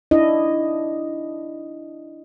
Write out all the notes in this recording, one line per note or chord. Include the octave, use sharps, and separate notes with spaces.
D4 E4 D#5